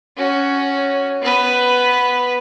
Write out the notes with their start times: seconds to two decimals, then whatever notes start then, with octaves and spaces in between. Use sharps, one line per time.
0.17 C#4 F#4
1.22 B3 B4